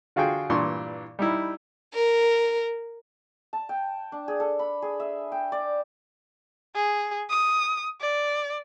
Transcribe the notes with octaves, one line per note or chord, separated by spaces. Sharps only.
D3 F4 F#4 G#4 F5 G5
G2 A#2 E3 D4 C6 C#6
G3 D#4 E4
A#4
A5
G5
D4
G#4
A4
B5
G#4
E5
G5
D5
G#4
D#6
D5